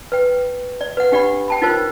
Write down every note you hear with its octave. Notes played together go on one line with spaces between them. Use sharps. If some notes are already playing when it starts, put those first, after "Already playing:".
B4 G5
D5
B4 F#5
D4 G4 D5 F#5 B5
G5 A5 B5
D#4 F4 A#4 C5